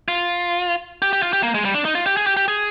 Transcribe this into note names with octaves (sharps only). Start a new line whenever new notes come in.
F4
G4
G4
F4
G4
A#3
G#3
G3
D4
D#4
F4
G4
G#4
G4
G4
G#4